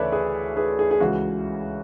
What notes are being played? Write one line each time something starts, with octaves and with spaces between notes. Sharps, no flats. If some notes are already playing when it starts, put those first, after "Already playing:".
Already playing: D2 C#3 E3 A4 B4 C#5 D5 E5
G#4 B4
G#4 B4
G#4
G#4
C#2 C#3 E3 F#4